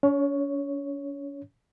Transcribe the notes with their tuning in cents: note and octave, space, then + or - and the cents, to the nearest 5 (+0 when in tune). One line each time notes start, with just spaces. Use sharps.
C#4 +40 C#5 +5